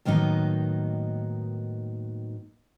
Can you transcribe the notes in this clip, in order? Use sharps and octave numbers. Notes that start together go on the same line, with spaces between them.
A2 D#3 F#3 A#3 B3 D#4